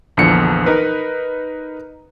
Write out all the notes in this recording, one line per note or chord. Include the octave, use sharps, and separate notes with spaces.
A#1 E2 D3 F3 C#7
D#4 A#4 B4